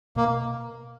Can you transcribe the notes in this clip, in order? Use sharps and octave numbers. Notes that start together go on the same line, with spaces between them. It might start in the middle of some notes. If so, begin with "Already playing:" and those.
B2 A#3